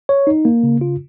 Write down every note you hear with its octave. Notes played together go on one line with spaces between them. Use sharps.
C#5
D#4
A#3
C#3
F4